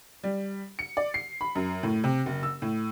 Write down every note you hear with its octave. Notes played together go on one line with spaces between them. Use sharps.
G3
C#7
D5
C7
B5
F#2
A2
C3
F#1
E6
A2